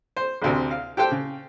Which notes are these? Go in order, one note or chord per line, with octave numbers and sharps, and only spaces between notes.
C5
A1 D2 C3
F5
G4 A4 C5 G5
C#3